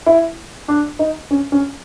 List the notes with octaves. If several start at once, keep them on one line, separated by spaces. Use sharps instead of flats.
E4
D4
D#4
C#4
C#4